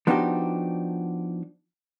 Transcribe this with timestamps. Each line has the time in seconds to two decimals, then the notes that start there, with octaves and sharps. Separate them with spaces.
0.07 F3 B3 D4 D#4 F#4 G4